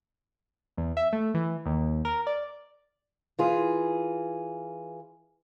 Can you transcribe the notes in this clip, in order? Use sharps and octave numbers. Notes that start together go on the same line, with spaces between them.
E2
E5
A3
E3
D#2
A#4
D5
E3 F4 G#4